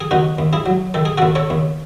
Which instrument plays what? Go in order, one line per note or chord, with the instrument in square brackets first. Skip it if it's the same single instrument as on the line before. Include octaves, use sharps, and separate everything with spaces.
[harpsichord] G#4
D#2 D#4 F#4
D#2
E4 G#4
F#3
D#3 A4
G#4
D#2 F#4 A4
A4 C#5
D#2